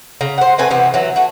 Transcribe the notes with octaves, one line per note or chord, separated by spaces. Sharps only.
C#3 A#5
C5 F#5
A3 C4 B4 G#5
C3 E3 B3 C4
E3 F#3
A3 F#4